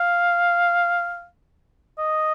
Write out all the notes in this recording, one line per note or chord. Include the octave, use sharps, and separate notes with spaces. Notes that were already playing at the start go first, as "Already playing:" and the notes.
Already playing: F5
D#5